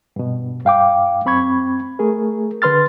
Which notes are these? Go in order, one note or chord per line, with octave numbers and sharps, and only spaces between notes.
G2 B2
G2 F5 G5 D6
F#2 C4 B5 C#6 G#6
A3 G#4 A#4
D3 B4 C6 F6 A6